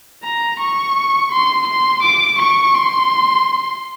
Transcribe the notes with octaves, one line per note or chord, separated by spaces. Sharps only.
A#5
C#6
C6
C6
D6
C#6
C6